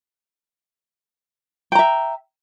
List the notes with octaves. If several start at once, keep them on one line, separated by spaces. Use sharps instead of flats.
E5 G5 A#5